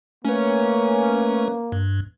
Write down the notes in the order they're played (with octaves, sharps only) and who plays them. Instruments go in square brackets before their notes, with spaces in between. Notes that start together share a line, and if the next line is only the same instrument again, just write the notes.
[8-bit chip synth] A3 B4 [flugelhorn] A#3 [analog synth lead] C#4
[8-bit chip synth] G2